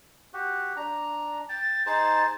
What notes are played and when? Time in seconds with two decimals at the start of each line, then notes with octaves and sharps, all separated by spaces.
0.34 F#4 G4
0.76 D4 A#5
1.49 G5 A6
1.86 D#4 G#4 C5 A6